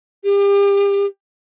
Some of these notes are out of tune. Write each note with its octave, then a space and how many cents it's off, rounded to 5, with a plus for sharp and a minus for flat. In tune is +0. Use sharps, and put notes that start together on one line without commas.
G4 +35